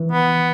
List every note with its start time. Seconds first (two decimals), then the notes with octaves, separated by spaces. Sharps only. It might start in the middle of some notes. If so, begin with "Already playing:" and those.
Already playing: E3
0.12 B3